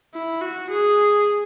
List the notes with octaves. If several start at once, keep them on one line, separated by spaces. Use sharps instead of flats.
E4
F#4
G#4